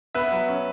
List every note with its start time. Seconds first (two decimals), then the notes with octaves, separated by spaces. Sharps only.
0.15 B3 B4 E5
0.32 F#3
0.49 C#4